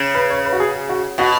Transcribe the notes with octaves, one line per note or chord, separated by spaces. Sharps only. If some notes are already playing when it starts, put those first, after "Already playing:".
Already playing: C#3
B4
C#5
B4
F#4
G#4
F#4
B2 F#4